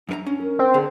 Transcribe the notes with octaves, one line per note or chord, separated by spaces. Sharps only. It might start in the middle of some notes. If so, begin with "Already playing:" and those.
F#2 D4 A#4 A#5
C#4 D4
A#4
C4
D3 G#4